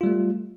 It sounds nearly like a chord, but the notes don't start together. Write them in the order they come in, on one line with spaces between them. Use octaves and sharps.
F4 G3 A3